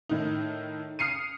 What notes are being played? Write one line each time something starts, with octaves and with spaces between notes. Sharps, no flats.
A2 D#3 D#4
D#6 F6 C7 C#7 D#7